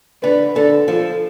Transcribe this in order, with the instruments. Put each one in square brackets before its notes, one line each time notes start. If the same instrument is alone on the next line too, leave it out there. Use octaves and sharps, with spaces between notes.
[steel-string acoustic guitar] D3 [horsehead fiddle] B4
[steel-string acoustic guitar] D3 [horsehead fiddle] A4
[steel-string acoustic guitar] F3 [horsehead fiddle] A4